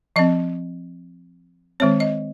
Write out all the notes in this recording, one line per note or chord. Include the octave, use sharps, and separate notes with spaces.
F3 C4 D#5
D#3 G#3 C4 C#5
D#5